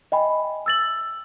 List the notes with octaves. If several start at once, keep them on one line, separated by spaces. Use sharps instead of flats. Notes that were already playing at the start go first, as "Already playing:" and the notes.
D#5 E5 G5 G#5 B5
E6 A6 F#7